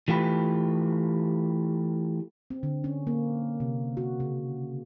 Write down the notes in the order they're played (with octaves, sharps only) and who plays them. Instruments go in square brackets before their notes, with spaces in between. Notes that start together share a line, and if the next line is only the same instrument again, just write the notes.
[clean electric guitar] E3 A3 F4 G4 B4
[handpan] C4
D3
C#4
A#3
C3
F#4
C#3